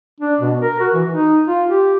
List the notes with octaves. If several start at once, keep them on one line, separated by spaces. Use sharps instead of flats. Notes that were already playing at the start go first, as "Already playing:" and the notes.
D4
B2
A#4
F#4
E3
D#4
F4
G4